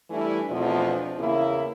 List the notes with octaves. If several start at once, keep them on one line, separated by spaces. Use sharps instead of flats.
E3 G3 A3 D4 E4
E2 B2 F3 A3 C4 D4
E2 C#3 A#3 E4